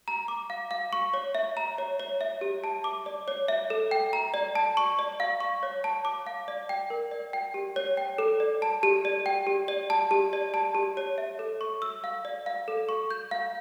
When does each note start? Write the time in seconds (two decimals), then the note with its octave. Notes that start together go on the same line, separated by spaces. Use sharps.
0.08 A#5
0.28 D6
0.50 F5
0.71 F5
0.93 C#6
1.14 C#5
1.35 E5
1.57 A#5
1.78 C#5
1.99 C#5
2.21 E5
2.41 G4
2.64 A5
2.84 D6
3.06 D5
3.28 C#5
3.48 E5
3.70 A4
3.91 G5
4.13 A#5
4.34 D5
4.55 A5
4.77 C#6
4.99 D5
5.20 F5
5.40 C#6
5.63 C#5
5.84 A5
6.05 D6
6.26 F5
6.48 D5
6.69 G5
6.90 A#4
7.11 D5
7.33 G5
7.54 G4
7.76 C#5
7.97 G5
8.18 A4
8.40 D5
8.62 A5
8.83 G4
9.05 D5
9.26 G5
9.47 G4
9.68 D5
9.90 A5
10.11 G4
10.33 D5
10.54 A5
10.75 G4
10.97 C#5
11.18 E5
11.39 A4
11.61 C#6
11.82 E6
12.04 F5
12.25 D5
12.46 F5
12.68 A4
12.89 C#6
13.11 G6
13.31 F5